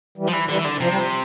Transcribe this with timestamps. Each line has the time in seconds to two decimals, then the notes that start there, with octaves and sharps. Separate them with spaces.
0.18 E3 G3
0.28 F3
0.33 E3
0.48 D3 E3 G3
0.59 E3
0.65 D3
0.80 C3 F3
0.89 G3
0.98 F3